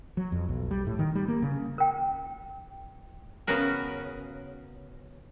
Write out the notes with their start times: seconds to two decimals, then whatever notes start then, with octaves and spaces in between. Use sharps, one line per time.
0.17 F#3
0.32 F2
0.49 B1
0.71 G3
0.87 A2
0.99 D#3
1.15 G3
1.28 A#3
1.42 C#3
1.78 A#4 G5
3.47 C#3 B3 C#4 F#4 A#4